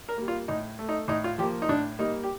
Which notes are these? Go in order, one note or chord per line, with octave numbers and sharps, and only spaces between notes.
A#4
G3 A#3
F4
A2 D#4
A3
D#4
A2 D#4
F4
F3 A#3 G4
D#4
A2 D4
G3 A#3 D#4
G4